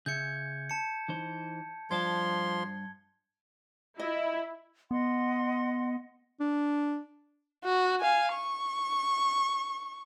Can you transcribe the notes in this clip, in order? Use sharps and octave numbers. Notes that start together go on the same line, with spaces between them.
C#3 G#4 E5 G6 G#6 C#7
A5 C#7
E3 D#4 C5
G2 F3 D5 A5 C6 G#6 G7
E4 D#5
B3 D#5 F#5 C6
D4
F#4
F5 G#5
C#6